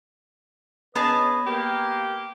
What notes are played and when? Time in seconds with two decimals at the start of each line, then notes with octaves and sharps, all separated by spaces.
0.95 B3 C#4 G#4 B4 D#5 A5
1.46 A#3 G4